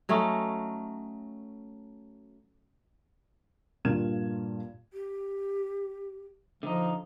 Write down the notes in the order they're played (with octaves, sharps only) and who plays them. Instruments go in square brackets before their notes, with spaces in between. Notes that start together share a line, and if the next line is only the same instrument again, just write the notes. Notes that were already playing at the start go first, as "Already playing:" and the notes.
[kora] F#3 A3 C#4 D#4
[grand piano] G2 A#2 F4 G#6 E7
[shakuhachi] G4
[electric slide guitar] D3 D#4 [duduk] F3